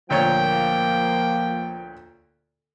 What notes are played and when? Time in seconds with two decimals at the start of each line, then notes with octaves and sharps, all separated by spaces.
0.10 D2 A#2 F3 A#3 C#5 G5